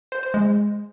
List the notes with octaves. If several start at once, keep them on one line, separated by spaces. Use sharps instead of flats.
C5
C5
G#3